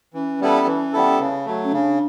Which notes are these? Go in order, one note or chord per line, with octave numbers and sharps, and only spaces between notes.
E3 C#4
G3 B3 E4 A4
E3
G3 B3 E4 A4
C#3
F#3 A3
C#4
C#3 D4